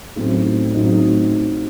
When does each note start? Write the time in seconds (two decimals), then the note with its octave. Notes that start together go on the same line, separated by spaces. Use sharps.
0.16 A1 A2 F#3 C4 D#4
0.74 A1 A2 F#3 C4 D#4